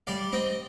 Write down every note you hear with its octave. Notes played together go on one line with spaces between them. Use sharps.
G3 D5 F5
C4 D#5 G5